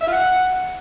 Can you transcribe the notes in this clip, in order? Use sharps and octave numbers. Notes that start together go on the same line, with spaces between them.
E5
F4
F#5